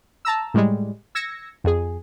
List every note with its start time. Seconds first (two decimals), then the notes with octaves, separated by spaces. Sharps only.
0.25 A5 A#5 E6
0.54 A2 G3 G#3
1.15 E6 G#6 A#6 C#7
1.64 F2 G#4